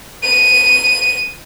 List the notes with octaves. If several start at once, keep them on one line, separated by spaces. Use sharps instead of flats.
D#7